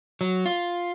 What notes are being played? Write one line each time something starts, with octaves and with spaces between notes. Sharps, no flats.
F#3
F4